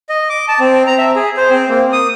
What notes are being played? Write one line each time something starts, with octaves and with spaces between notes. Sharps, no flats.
D#5
D6
A5
C4
A#5
E5
G#4
C5
C4
A#3
D#6